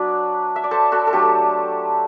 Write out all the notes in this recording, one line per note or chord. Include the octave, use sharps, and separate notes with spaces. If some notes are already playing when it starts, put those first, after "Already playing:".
Already playing: F#3 B3 D4 B4 D5 E5
E5
D5
A4 C5
F#4 A4
A4
F#3 A3 D4 G4